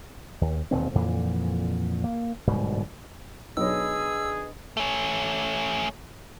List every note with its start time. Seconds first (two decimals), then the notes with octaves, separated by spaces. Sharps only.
0.41 D#2
0.71 E1 D#2 A#2 C4
0.95 F2 A#2 D3 E3
2.04 A#3
2.47 D1 G#2 B2 G3
3.57 B1 D4 G#4 B4 C#5 D#5 E6
4.77 A3 C#4